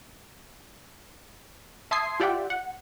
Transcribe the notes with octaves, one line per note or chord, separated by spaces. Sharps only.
E5 A5 C6 D#6 G#6 C7
F4 G4 D5 E5 F#5 G5
F#5